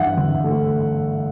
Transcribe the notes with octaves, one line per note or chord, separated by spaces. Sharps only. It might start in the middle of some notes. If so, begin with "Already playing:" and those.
Already playing: G2 E3 E5 F#5
G1
A3